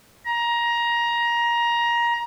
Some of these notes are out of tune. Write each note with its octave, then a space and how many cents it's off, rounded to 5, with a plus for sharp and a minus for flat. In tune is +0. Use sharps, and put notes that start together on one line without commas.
A#5 +20